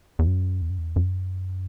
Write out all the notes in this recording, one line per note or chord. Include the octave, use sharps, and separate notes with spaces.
E2
F#2
E2
F#2
E2
F#2